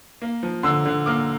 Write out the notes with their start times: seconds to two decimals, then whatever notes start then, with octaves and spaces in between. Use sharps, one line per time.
0.22 A#3
0.43 F3
0.63 D3 C6 E6
0.86 D3
1.06 A#3 D6 F6